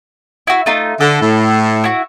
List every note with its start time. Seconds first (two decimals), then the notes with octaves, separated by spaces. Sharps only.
0.47 E4 F#4
0.66 A3 D#4 F4
1.00 D3 A4
1.21 A2
1.84 E4 F#4